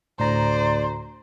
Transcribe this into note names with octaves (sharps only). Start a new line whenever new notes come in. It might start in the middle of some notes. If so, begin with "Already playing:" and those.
D2 A2 C5 D5 A#5